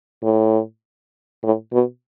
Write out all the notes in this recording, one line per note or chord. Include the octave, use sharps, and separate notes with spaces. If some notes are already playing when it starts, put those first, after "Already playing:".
A2
A2
B2